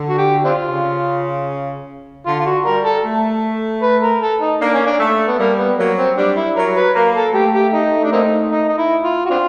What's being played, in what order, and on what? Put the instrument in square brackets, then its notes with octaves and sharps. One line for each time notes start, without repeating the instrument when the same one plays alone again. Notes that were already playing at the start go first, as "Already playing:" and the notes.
Already playing: [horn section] D3
[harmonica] F#4
G4
C4 D4 F4
[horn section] C#3
[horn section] D3 [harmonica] F4
[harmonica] F4
F#4
[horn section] G3 [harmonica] A#4
[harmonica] A4
[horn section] A3
[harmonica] B4
A#4
A4
D#4
[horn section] A#3 [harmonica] D4
[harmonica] C#4
D4
[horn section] A3
[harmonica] B3
[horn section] G3 [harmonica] A#3
[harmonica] B3
[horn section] F#3 [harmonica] A#3
[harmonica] C4
[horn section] G3 [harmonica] D4
[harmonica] E4
[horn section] F#3 [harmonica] A#4
[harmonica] B4
[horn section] A#3 [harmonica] A#4
[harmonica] A4
[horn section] A3 [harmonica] G4
[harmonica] G4
D#4
D4
A#3 C4 D#4
D#4
D#4
E4
F4
F#4
C4 D4 F4